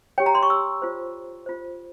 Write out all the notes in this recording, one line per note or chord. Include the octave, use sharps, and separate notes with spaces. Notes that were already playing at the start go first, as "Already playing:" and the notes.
G4 C#5 G5
A#5
C6
C#6
E6
F4 C5
F4 C5